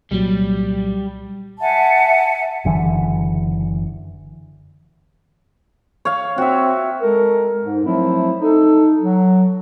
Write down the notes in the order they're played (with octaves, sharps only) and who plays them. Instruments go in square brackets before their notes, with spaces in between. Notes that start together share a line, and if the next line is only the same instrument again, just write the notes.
[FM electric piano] C2 A#2 F#3 [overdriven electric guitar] G3
[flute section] E5 F#5 G#5 A5
[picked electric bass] F#1 D3 E3
[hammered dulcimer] C#5 F5
[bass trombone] C4 [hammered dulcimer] F#4 E5
[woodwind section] G#3 A4 A#4
G#2
F3 F#3 A3 C4 E4
D#4 A4
F#3